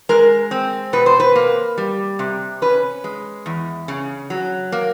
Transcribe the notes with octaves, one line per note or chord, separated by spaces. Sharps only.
G#3 A#4
C4
B2 B4
C5
B4
A#3
G3
C3
C#4 B4
G#3
E2
C#3
F#3
A#3